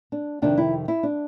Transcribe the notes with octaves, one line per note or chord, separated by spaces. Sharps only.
D4
F2 C3 D#3 D4
E4
E4
D4